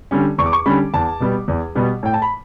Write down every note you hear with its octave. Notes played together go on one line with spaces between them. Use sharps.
D3 G3 C#4
E2 C#6
D6
C#6
D3 G3 C#4 B5
E2 A5
B2 G3 B3
E2
B2 G3 B3
A2 G5
A5
B5